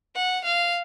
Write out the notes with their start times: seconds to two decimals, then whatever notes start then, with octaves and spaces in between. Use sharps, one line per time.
0.16 F#5
0.45 F5